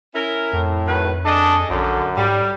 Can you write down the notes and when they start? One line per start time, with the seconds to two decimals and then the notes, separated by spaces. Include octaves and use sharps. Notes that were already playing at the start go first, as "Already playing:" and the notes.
0.15 C#4 E4 A#4
0.53 F2 A2
0.87 D#3 F#3 B4
1.25 D4 G#4 A4 D#5
1.70 A#1 F#2 D3
2.17 G#2 G3